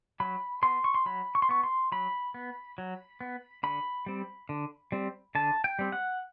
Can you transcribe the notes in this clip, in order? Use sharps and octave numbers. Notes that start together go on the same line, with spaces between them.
F#3 B5
B3 C6
C#6
C6
F#3 B5
C#6
C6
B3 C#6
C6
F#3 B5
B3
F#3
B3
D3 B5
G3 C4
D3
G3 C4
D3 A5
G5
G3 C4
F#5